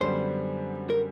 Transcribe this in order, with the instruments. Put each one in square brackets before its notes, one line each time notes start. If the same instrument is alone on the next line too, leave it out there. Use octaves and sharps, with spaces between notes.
[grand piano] F#2 D3 G3 B3 [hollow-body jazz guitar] C5
[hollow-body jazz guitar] A#4